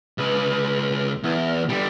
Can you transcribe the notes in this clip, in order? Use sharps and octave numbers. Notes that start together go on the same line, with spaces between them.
C#2 B4
E2
D3 G3